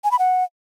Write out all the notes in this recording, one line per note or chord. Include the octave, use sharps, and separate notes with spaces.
G#5
B5
F#5